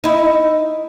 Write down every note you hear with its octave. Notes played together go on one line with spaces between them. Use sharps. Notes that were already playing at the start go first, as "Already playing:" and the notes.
D#4 E4